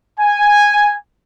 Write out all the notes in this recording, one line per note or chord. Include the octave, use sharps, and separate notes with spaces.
G#5